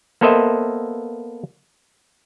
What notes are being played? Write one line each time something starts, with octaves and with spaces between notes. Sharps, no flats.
A#3 B3 A4 C5 D#5 E5